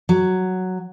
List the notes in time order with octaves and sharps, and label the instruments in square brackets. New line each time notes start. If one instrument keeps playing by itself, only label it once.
[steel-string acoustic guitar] F#3